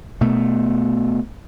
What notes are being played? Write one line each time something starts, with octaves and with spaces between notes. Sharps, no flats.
B2 A3